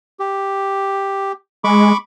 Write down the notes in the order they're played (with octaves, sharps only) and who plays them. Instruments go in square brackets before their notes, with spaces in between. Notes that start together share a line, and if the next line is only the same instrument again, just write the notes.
[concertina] G4
[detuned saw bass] G#3 [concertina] B5 C#6 D6